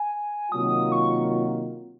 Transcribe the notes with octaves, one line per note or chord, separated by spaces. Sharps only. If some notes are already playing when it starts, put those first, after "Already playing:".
Already playing: G#5
C3 D#3 F#3 A#3 F4 D#6
C#6